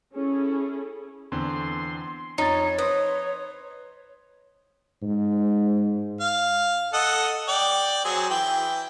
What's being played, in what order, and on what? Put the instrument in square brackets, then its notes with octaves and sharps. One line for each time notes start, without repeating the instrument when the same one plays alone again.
[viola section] C#4 E4 G#4 A4
[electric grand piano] E2 D3 C4 [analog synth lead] C6
[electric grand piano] F2 A6 [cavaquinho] D#4 [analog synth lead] C#5
[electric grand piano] B4 C5 C6 [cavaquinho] D#5
[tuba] G#2
[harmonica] F5
A4 D#5 F#5
D5 G5
F#3 C4 G#4
E3 G5